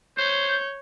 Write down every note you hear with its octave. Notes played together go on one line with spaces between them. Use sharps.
C5 C#5 G6